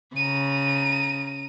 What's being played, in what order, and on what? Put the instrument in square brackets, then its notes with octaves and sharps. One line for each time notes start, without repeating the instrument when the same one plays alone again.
[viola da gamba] C#3 [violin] A#5 D#7